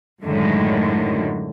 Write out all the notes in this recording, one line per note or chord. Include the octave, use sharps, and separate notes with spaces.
F#2 A2 D3 D#3 F#3 G#3